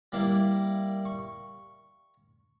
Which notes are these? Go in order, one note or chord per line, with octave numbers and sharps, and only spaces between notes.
G3 A#3 E4
C#6